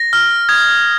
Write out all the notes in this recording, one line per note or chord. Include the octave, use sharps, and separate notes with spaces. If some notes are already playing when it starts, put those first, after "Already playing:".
Already playing: A#6
F6
D#6 G#6